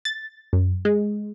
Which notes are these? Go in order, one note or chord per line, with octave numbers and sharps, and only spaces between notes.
A6
F#2
G#3